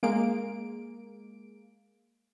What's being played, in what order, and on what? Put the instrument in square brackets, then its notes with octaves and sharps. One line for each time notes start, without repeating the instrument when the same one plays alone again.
[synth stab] G#3 A#3 D7